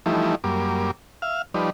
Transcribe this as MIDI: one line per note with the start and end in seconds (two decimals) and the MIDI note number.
0.06 0.35 52
0.06 0.35 53
0.06 0.35 55
0.06 0.35 57
0.06 0.35 63
0.06 0.35 64
0.44 0.91 42
0.44 0.91 55
0.44 0.91 58
0.44 0.91 86
1.22 1.42 76
1.22 1.42 77
1.22 1.42 89
1.54 1.70 53
1.54 1.70 55
1.54 1.70 63
1.54 1.70 71
1.54 1.70 74